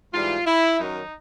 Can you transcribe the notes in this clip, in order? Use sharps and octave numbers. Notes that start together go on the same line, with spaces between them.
G#2 E3 G3 F4
E4
F#2 D#3 F#3 D#4